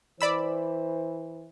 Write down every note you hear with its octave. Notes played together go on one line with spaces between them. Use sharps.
E3 C5 D5 B5 E6